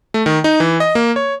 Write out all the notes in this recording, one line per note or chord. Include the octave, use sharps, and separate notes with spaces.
A3
D#3
D#4
E3
D#5
A#3
C#5